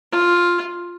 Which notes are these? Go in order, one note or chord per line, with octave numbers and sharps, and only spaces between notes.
F4